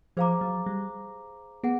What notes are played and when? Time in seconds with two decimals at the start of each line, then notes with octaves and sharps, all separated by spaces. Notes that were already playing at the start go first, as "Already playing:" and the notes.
0.17 F3 G#4 C5 F5 A#5 D6
0.41 F#3
0.66 G3
1.64 B3 G#4 F#5